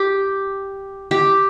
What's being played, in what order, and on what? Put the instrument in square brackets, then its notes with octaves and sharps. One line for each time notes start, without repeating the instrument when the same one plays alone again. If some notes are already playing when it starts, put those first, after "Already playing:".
Already playing: [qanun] G4
G4